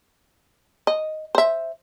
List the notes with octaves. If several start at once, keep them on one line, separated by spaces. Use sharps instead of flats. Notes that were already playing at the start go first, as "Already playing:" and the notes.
D#5
C5 E5